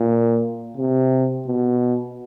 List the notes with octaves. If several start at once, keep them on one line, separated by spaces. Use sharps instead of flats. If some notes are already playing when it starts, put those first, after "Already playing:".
Already playing: A#2
C3
B2